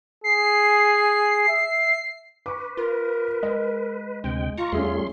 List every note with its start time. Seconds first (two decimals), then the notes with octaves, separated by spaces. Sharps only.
0.24 G#4 C7
1.48 E5
2.46 B4 C#6 D6
2.77 F4 A#4
3.43 G#3 D#5
4.24 D2 C3 G#3 G5
4.58 F4 A#5 C#6
4.73 E2 G3 A3 C#4 G#4 E5 C6